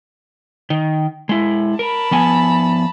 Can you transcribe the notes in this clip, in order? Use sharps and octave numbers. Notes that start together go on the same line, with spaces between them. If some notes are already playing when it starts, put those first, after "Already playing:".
D#3
G#3 E4
A#4 A5 B5
F3 B3 G#5